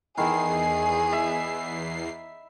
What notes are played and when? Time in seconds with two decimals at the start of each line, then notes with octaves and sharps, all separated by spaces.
0.17 E2 D#3 E4 G#4 C7
1.13 E5